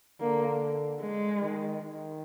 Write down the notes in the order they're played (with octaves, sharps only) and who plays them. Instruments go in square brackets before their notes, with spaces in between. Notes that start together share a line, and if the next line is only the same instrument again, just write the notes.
[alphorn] D3 [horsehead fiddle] A#3
[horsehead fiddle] G#3
[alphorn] D#3
D#3